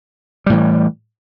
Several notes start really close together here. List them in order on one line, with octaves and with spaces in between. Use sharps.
G3 A2 E3